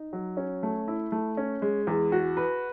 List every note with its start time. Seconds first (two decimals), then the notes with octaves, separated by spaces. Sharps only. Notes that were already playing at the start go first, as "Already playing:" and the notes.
Already playing: D#4
0.13 F#3
0.37 C#4
0.63 A3
0.88 E4
1.12 A3
1.37 C#4
1.62 G#3
1.87 E2
2.12 F#4
2.37 B4